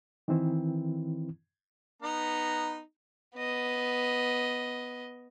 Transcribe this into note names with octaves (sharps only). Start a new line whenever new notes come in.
D#3 E3 C4 E4
B3 D#4 A#5
B3 D#5